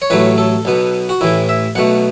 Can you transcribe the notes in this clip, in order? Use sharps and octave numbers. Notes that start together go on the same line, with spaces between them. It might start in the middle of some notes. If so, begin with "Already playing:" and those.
C#5
A1 A2 F#3 A3 B4
A4
B1 B2 B3
F#4
A1 A2 E3 E4
E5
B1 B2 A3 F#5